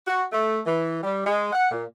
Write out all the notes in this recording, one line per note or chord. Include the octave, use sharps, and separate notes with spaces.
F#4
A3
E3
G3
G#3
F#5
A#2